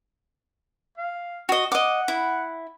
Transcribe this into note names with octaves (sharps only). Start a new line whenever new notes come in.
F5
F#4 D#5
D#5 F#5 D6
E4